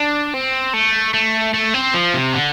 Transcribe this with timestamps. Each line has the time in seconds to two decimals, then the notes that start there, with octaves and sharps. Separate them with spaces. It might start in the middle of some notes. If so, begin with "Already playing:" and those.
Already playing: D4
0.34 C4
0.74 A3
1.14 A3
1.54 A3
1.74 C4
1.94 F3
2.14 C3
2.34 D3